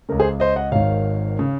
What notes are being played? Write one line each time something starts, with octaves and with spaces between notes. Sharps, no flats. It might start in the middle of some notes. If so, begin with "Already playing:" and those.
C#2 C#3 A#4
G#4 C5
C5 D#5
D#5 F#5
G#1 G#2 D#3 C#5 F5
C#3